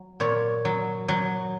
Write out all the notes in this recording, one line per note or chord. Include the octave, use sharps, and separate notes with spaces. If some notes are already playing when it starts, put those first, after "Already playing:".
Already playing: F#3
A#2 C#5
F#3
F#3